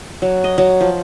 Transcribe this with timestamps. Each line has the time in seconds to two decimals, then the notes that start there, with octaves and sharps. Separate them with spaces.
0.22 F#3
0.44 D#5
0.58 F#3
0.81 F3